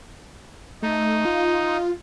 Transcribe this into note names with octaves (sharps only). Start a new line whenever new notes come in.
A3 D#4
F4